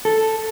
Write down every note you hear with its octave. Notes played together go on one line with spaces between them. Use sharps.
A4